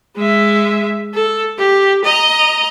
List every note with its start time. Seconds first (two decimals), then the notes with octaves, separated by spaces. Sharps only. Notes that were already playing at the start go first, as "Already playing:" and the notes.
0.16 G#3 E5
1.14 A4
1.58 G4
2.05 D#5 A#5